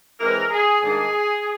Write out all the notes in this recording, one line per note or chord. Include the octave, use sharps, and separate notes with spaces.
E3 G#3 C4 E4 A#4
G#4
G#2 D#3 G3 A#3 D4 G#4